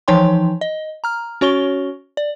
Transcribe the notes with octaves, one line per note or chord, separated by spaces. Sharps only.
E3 F3 D#4 C#5 G5 C6
D#5
A#5 F6
C#4 F#4 C#5 C#6 G7
D5